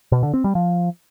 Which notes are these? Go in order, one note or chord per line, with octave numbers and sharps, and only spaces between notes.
B2
D3
C4
G3
F3